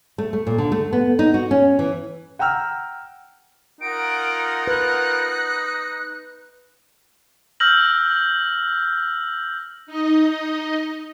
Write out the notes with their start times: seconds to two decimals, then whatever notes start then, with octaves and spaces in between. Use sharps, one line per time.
0.18 A3
0.33 A3
0.47 A#2
0.58 D3
0.72 A3
0.93 B3
1.19 D#4
1.34 F#4
1.51 C#4
1.79 E3
2.39 F#5 G5 A#5 E6 F6
3.81 D#4 F4 A#4 F#5 D7
4.67 B4 F#6
7.60 E6 F6 G6 A#6 F#7
9.87 D#4 D#5